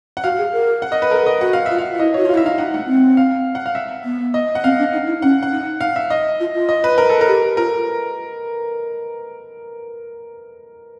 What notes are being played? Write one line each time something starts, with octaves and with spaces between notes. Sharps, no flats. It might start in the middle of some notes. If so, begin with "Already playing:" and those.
F#5
F#4 F5
G#4
A#4
F#5
D#5
B4
A4 A#4
D#5
F#4 F#5
F5
F4 E5
F5
F4
E4 D#5
F#4 C#5
F4 F5
E4 E5
D#4 F5
D#4 F#5
A3 F#5
C4
F5
F#5
F5
E5
B3
D#5
F#5
C4 F5
D4
D#4
E4
C#4 F#5
F#5
D#4
F5
E5
D#5
F4
F4
D#5
B4
A#4
A4
A#4
G4
F4 A#4